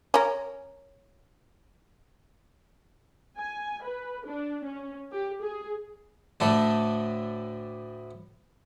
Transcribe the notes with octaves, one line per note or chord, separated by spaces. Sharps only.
C#4 A#4
G#5
B4
D4
C#4
G4
G#4
D2 A2 A3 D4 A4